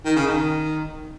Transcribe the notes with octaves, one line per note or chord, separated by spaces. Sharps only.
D#3
C#3
D#3